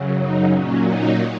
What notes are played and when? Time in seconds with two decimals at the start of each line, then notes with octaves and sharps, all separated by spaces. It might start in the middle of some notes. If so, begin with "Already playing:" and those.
Already playing: F#2 C#3 F#3
0.18 D#4
0.52 A#2 F#3 C#4
0.86 D#4